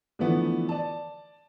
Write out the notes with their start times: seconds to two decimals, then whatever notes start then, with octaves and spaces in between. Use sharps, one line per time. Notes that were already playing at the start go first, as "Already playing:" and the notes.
0.19 D3 E3 F3 A3 B3
0.69 D5 A5